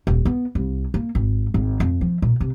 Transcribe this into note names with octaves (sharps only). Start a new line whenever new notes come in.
D#1
B3
C2
A#3
G#1
G#1
F2
F3
A#2
C3